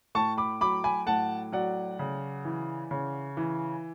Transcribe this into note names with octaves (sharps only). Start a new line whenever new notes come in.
A2 A5 C#6
B5 D6
F#3 B5 D6
G#5 B5
A2 F#5 A5
F#3 D5 F#5
C#3
E3
C#3
E3